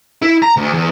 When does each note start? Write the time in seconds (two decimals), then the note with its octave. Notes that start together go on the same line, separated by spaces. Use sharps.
0.22 E4
0.42 A#5
0.57 D2
0.73 E2